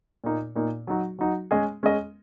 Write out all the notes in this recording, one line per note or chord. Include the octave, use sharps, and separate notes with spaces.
A#2 A#3 D#4
A#2 A#3 D#4
F#3 D#4 F#4
F#3 D#4 F#4
G#3 C#4 G#4 D#5
G#3 C#4 G#4 D#5